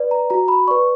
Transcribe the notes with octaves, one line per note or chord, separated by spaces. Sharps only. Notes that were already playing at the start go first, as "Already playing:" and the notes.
Already playing: B4 D5
A#5
F#4 A#5
B5
B4 D5 C#6